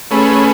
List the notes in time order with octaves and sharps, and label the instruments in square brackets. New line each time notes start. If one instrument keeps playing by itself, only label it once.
[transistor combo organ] A3 C#4 G#4 B4